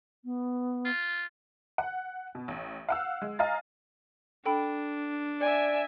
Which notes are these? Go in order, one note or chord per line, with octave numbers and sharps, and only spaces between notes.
B3
F4
F#5
B2
A1
F5 F#5 E6
G#3
D#5 F5 G#5 A#5 A6
D4 A4 G5 B5
D5 E5 G#5